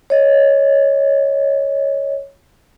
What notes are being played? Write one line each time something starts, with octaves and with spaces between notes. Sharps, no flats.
C#5 D#5